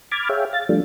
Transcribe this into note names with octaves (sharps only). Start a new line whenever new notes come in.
B5 D6 F6 G#6 A6
G#4 C#5 E5 F5 G5
F5 A6
F3 G3 A3 D4